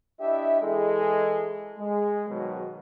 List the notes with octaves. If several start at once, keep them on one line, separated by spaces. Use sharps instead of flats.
D4 E4 G4 D#5 E5
E3 G#3 E4 G#4 A4 D#5
G#3
G#2 B2 D#3 F#3